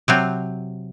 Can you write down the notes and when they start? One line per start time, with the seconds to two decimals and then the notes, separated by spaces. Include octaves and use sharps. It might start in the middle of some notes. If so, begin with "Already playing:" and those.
0.08 C3 F#3 C4